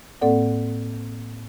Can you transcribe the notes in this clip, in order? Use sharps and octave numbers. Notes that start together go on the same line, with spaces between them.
A2 A#3 C4 A4 D5 F#5